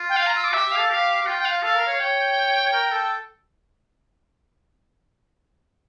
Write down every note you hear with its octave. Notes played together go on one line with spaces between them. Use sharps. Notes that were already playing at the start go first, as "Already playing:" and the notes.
Already playing: F4
G5
F5
A#5
E6
D6
G4 E5
G4
F5
A4
G4 F5
G4
F4 G5
G5
F5
A4 F5
A#4
C#5
C#5 G5
A#4
A4